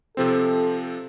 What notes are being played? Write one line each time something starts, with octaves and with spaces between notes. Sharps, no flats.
C3 F3 C4 A4